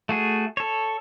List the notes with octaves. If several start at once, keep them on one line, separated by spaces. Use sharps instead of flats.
A3 F#4 G#4
A4 C#5